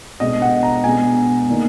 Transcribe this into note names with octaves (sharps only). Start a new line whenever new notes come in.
B2 G#3 D4 D#5
F#5
A#5
B2 G#3 B3 D4 G#5
D#3 A#3 D4